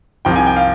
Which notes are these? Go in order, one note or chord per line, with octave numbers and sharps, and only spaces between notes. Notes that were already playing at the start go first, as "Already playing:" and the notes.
C2 C3 F3 G5
G#5
G5
F5